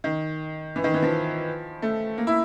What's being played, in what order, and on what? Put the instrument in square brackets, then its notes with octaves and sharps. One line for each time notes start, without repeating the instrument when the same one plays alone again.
[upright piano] D#3
E3
D#3
E3
F3
A3
A#3
E4